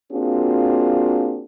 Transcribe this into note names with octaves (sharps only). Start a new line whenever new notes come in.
A#3 C4 D4 F4 F#4 G#4